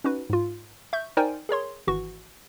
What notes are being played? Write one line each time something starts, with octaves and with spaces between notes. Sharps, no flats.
C#4 D#4 F#4 B4
G#2 F4
E5 C#6 G6
D#4 A#4 C5 D5 G5 G#5
G#4 A#4 C#5 C6
G#1 E3 F#4 C#6